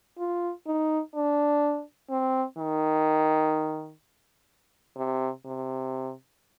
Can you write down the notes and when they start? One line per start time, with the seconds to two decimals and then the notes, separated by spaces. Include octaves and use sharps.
0.18 F4
0.67 D#4
1.15 D4
2.10 C4
2.58 D#3
4.97 C3
5.45 C3